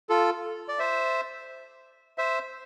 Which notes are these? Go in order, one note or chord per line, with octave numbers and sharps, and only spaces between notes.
F4 A4
D5
C5 E5
C5 E5